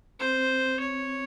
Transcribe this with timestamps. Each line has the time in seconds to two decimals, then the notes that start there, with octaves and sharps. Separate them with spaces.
0.20 C4 C5
0.80 C#5